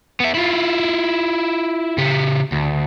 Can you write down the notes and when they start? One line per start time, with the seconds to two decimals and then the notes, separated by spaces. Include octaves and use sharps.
0.20 B3 E5
0.35 E4 F4
1.98 C#3 G4
2.52 D2